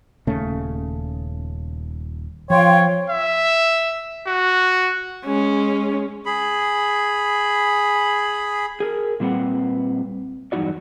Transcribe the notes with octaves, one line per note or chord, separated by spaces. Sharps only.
D#1 C#3 A3
F3 C#5 F5 G5 C6
E5
F#4
G#3 C#4
G#4 B5
G#4 A#4
A#2 G3 C4 B4 F#5
E2 G2 F#3 D#4 F#4 D5